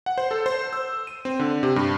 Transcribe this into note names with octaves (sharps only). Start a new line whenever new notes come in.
F#5
C5
A4
C5
E6
D#7
C4
D3
C3
G2